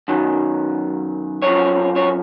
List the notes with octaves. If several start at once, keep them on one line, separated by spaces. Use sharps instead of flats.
F#2 D#3 F#3
F#2 F3 C#5
C#5